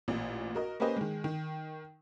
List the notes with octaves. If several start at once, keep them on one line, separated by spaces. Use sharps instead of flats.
A1 A#2
F#4 A#4 D#5
A#3 C#4 G4 B4 C5 D#5
D#3 G#3
D#3